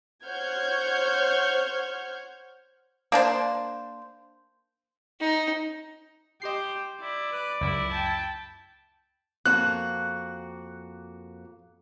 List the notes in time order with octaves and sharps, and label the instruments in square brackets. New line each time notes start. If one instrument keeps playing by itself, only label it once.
[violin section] C5 C#5 F#5 F6 G6 G#6
[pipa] A#3 D4 C5 A5
[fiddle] D#4
[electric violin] G4 C5 [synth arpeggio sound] D#5 C7
[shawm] E4 [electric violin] D5
[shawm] B4
[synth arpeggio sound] C#2 F#2 [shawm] E4
[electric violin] G5 A5
[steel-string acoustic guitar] F2 A#3 F#4 [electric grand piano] F#6